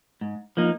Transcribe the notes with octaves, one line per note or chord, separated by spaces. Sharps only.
G#2
F3 A#3 D#4